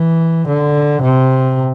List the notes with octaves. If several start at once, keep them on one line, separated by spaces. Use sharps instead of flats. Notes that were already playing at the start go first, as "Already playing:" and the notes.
Already playing: E3
D3
C3